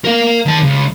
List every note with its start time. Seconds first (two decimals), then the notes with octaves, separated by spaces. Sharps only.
0.05 A#4 F5
0.46 D#3 A5
0.63 C#2